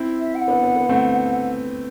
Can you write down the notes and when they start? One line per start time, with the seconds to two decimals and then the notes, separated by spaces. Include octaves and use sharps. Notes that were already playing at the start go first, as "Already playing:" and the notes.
Already playing: C4 E4
0.21 E5
0.35 G5
0.39 F#5
0.48 B3 D4
0.63 B3
0.76 B3
0.89 A3 C4